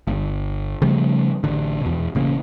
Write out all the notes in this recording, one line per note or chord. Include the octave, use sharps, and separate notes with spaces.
G1
C#3 F3 G3 A3
A1 D3
E2 B2
A1 C#3 A#3